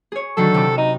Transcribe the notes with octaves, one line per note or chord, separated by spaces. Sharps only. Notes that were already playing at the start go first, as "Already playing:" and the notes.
G#4 C#5
D3 D#3 F#3 A4
C3 E4 D6
D#4